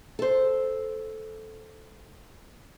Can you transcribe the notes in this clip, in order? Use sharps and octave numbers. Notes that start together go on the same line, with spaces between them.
A4 C5